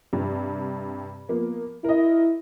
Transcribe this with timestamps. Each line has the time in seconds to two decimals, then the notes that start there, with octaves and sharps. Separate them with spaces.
0.13 G2 C3
1.28 F3 A#3 B3
1.84 E4 A#4 D#5